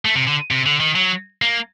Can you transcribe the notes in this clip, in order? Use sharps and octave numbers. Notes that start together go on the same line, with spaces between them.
A3
C3
D3
C3
D3
D#3
F#3
A#3